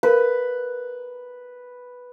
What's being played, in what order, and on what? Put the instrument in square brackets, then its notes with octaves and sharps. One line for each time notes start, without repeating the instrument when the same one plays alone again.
[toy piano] A#4 F5 [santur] B4